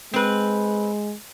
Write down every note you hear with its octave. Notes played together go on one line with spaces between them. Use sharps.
G#3 C4 B4